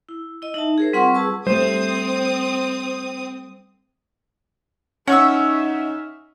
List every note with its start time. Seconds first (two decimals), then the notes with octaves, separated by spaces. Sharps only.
0.09 E4
0.42 E4 D#5
0.54 D#4 E5 A5
0.78 G#4 A#4 C5
0.93 G3 C4 F4 F#5 C6 C#6
1.14 G#4 B4 A5 C#6 E6
1.47 G3 A3 C4 C5 D#6
5.08 C#4 D#4 E5 F#5 C#6 E6